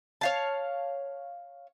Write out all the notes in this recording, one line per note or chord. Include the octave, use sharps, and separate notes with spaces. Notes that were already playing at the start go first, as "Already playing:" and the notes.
C#5 F5 A5